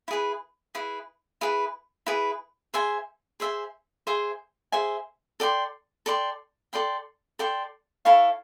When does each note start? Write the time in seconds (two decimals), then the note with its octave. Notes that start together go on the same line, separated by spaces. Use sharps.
0.08 E4 G#4 B4
0.75 E4 G#4 B4
1.41 E4 G#4 B4
2.07 E4 G#4 B4
2.74 G#4 C5 E5 G#5
3.40 G#4 C5 E5 G#5
4.07 G#4 C5 E5 G#5
4.72 G#4 C5 E5 G#5
5.40 A4 D5 G5 C6
6.06 A4 D5 G5 C6
6.73 A4 D5 G5 C6
7.39 A4 D5 G5 C6
8.05 E4 A4 C#5 F5